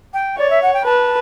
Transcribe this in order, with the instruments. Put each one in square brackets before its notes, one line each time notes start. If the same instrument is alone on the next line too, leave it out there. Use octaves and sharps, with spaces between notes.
[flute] G5
[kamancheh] C#5 [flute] D5
[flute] E5
F#5
G5
[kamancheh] B4 [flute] A5